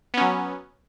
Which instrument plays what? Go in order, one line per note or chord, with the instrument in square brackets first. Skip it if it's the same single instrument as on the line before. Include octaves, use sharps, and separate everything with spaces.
[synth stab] B3
C#4
F#3